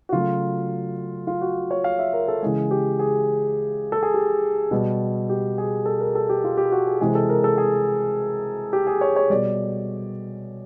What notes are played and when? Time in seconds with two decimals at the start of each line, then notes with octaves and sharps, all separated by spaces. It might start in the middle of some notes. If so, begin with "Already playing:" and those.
0.09 F#4
0.12 C#3 F#3 A3 F4
1.27 F4
1.41 F#4
1.71 C#5
1.84 F5
1.99 E5
2.13 A#4
2.28 A4
2.42 C#3 E3 G#3 G#4
2.71 G4
2.99 G#4
3.92 A4
4.03 G#4
4.14 G4
4.71 B2 G3
5.29 G4
5.58 G#4
5.86 A4
6.00 A#4
6.15 A4
6.29 G4
6.44 F4
6.58 G4
6.72 F#4
6.86 G#4
7.01 C3 E3 G#3 G#4
7.15 A4
7.29 A#4
7.44 A4
7.58 G#4
8.73 G4
8.87 G#4
9.01 C#5
9.16 C#5
9.30 B2 G3 D5